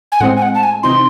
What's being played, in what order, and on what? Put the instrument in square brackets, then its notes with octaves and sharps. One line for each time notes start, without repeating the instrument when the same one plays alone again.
[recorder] G#5
[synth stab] A2 G#3 C4 [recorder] F#5
[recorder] G#5
F#5
A5
G#5
[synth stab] C3 E3 C4 D#4 [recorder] C6